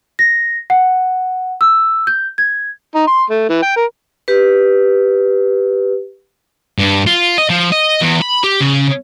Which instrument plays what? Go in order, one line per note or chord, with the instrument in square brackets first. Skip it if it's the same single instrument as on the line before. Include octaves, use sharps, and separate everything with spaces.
[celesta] A#6
F#5
E6
G6
G#6
[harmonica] D#4
C6
A3
E3
G5
A#4
[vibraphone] G4 B4
[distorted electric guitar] G2
F4
D#5
F3
D#5
E2
B5
G4
C#3